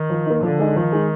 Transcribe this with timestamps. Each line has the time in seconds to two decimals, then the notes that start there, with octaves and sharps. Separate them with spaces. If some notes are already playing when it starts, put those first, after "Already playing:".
Already playing: D#3
0.10 F3
0.26 A#3 D#4
0.43 D3 F3
0.59 G#3 D#4 G#4
0.76 D#3 F3
0.92 G#3 D#4 G#4